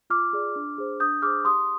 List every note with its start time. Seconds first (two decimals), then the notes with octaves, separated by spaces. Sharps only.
0.10 F4 D6 F6
0.33 G#4 D5
0.56 D4
0.78 G#4 C5
1.00 D4 D#6 G6
1.22 G#4 C5 D6 F6
1.45 G4 C6 D#6